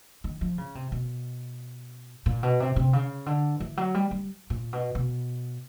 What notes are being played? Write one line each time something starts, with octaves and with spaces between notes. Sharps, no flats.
D#3
F3
C#3
C3
B2
A#2
B2
C3
C3
C#3
D3
E3
F#3
G3
G3
A#2
B2
B2